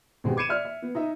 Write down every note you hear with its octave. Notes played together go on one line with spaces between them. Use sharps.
G#1 G#3 B3 F#4 G4
D6 G#6 C7 C#7 D#7 E7
D5 E5 F6
E5
B3
D#4 D#5 E5